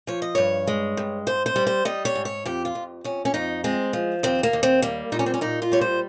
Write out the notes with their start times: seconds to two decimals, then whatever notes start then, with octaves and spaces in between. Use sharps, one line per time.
0.07 F3 C#5
0.22 D#5
0.35 G2 C#5
0.67 G#3
0.97 G2
1.27 G#2 C5
1.46 C5
1.56 G3
1.67 C5
1.85 G3 D#5
2.05 C#5
2.15 G#2
2.25 C#5
2.45 F2 G4
2.65 F4
2.75 F2
3.04 F2 C#4
3.25 C#4
3.34 F2 D#4
3.64 G#3 C4
3.93 F3
4.23 D#2 C4
4.43 A#3
4.53 D#2
4.63 C4
4.82 G3 A#3
5.12 A#2 D#4
5.19 C#4
5.26 C4
5.34 C#4
5.41 A#2 D#4
5.62 F4
5.72 G3 C#5
5.81 C5